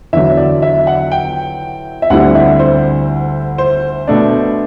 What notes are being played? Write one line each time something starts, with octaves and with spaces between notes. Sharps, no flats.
E2 D3 F#3 E5
D5
E5
F#5
G5
E5
D2 D3 G3 C4 E4 F#5
E5
C5
C5
B2 A3 D4